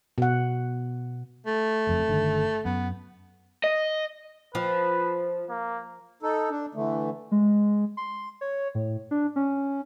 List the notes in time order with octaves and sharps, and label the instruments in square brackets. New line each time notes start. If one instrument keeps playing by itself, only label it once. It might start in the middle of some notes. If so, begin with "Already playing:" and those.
[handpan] B2 F#5
[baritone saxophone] A3
[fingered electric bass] F#1 F2
G1 D3 D#3
[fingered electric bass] F#2 [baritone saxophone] B3
[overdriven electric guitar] D#5
[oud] F3 [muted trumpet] B4
[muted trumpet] A#3
[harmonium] D#4 A4
D4
D3 E3 A3
[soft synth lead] G#3
C6
C#5
A2
D4
C#4